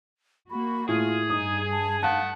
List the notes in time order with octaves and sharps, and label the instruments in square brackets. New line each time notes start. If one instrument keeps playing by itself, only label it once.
[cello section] A#3 F#4 [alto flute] B5
[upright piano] A2 [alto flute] F4 [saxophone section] G#4
[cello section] G2 [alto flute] D#4 [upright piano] D#6
[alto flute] A5
[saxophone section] A3 D#4 F#5 [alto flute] F5 [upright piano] A5